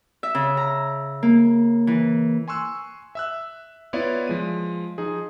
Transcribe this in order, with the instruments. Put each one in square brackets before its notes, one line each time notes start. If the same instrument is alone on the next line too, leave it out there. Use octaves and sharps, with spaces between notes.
[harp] E5
C#3
A#5
A#3
E3
[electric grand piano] G#5 C6 C#6 E6 F#6
E5 E6 F#6
B3 E4 F4 C#5 D5
F3 G#3 D#7
F3 D#4 G#4